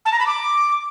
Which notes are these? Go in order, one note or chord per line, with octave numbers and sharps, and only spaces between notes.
A5
A#5
B5
D6